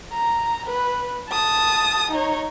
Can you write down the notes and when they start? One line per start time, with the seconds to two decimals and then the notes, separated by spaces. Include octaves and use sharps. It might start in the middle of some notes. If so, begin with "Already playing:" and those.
0.12 A#5
0.66 B4
1.30 A5 D#6
2.11 D#4 C#5